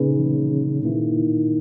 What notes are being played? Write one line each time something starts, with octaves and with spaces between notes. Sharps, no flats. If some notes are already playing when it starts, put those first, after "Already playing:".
Already playing: A#2 C#3 A#3 D#4 G#4 B4
A#2 D#3 A#3 E4